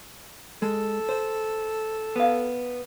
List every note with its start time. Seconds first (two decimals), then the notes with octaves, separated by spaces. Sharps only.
0.62 G#3 A4
1.09 C5
2.16 B3 F5